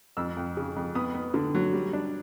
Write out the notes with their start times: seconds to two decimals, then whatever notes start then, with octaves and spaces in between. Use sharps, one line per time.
0.17 F2 E6
0.37 F2
0.57 C#3
0.76 F2
0.95 B3 D#6
1.14 B3
1.34 D3
1.55 F#3
1.73 G3
1.93 D4